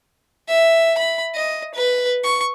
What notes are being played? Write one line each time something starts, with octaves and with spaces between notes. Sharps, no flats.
E5
B5
D#5
B4
C#6